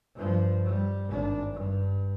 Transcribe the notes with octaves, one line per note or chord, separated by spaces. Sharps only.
G2 F3
G3
G#1 D4
G2